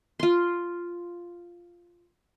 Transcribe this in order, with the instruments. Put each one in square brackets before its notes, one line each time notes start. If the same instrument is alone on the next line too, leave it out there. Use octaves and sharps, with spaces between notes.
[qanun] F4 C6